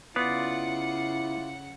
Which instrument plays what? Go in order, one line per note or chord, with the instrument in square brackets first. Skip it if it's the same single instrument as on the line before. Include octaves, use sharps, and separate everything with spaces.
[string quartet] C#3 F#5 [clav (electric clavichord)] B3 [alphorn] E4 [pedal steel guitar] F4 D5